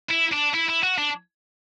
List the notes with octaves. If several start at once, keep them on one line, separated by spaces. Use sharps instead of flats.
E4
D4
E4
E4
F#4
D4